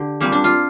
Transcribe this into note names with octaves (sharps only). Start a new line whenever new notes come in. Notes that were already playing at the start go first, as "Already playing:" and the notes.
Already playing: D3 G4
A#2 G3 A#3 C4
D4
F4